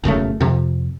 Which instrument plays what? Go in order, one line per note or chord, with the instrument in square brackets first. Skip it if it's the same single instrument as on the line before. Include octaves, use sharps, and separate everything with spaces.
[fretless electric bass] E1 F#2 C#3 A3
F2 C3